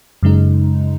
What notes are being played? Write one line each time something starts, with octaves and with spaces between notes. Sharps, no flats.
F#2 C#3 G#3 D#4